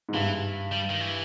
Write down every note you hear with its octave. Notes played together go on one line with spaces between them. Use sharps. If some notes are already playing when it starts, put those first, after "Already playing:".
G#2
G2 E3
G3
D#3
E3